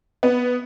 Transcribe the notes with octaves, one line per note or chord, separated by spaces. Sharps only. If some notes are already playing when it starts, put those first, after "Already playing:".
B3